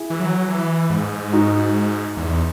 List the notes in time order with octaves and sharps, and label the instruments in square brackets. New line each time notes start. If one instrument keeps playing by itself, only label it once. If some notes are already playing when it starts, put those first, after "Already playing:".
Already playing: [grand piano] E4 G#4
[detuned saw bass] E3
F#3
E3
G#2
[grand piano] D#4 F#4
[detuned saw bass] E2